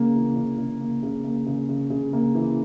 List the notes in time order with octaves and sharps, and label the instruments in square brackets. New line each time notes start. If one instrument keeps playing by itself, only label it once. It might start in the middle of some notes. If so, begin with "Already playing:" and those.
Already playing: [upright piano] C#3 A#3
E3
C#3
C#3
A#3
C#3
A#3
C#3
C#3
C#3
A#3
E3